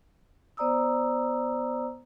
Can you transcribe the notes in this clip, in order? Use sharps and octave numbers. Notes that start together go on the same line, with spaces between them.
B3 C5 D5 A#5 D#6 E6